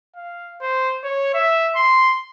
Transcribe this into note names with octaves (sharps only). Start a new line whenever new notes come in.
F5
C5
C#5
E5
C6